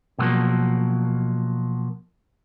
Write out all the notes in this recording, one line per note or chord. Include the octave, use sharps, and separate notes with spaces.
B2 D3 F3 F#3 A#3